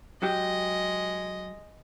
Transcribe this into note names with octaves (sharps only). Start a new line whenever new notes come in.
F#3 G#3 G4 D#5